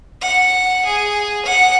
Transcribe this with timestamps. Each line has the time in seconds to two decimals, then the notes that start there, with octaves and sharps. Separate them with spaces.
0.22 F#5
0.86 G#4
1.45 F#5